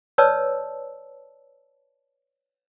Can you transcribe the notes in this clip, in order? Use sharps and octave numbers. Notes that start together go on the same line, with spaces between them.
B4 C#5 D5 A5 E6